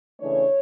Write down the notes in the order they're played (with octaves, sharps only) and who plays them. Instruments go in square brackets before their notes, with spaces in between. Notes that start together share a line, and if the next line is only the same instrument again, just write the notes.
[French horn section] C#3 E3 A3 D4 C#5